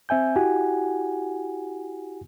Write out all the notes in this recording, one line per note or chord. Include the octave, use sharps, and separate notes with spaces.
C4 E5 G#5 G6
E4 F#4 G4 F#5 G#5